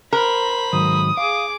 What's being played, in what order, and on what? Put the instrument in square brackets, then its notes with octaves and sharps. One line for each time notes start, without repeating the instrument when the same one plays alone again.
[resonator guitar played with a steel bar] A#4 [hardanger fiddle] C5 B5
[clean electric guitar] G#2 D#3 F#3 [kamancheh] D#6
[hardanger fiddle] G#4 D6 [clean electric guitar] F5